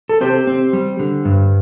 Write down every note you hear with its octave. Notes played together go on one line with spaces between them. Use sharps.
A4
C4 G4 C5
C4
G3
D3
G2